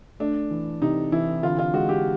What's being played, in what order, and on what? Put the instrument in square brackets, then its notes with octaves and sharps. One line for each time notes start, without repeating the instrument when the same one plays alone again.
[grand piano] A3 [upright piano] D4
[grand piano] E3
[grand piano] C3 [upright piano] D#4
[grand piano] E3 [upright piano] E4
[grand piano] D3 [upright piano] F4
[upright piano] F4
[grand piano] G#3 [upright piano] F#4
[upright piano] G4